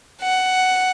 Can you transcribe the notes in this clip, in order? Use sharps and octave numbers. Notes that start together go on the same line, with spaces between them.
F#5